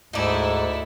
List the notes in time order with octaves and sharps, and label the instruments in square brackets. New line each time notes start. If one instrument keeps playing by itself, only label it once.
[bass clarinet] D2 [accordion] G#2 [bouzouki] D#4 D5 [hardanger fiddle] E4 A4